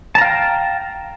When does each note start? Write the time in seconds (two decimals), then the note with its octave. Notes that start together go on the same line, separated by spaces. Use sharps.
0.15 A5
0.18 A#5
0.21 F5
0.25 G5